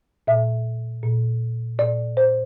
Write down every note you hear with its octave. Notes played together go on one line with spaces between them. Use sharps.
A#2 E5
A#2
A#2 D5
C5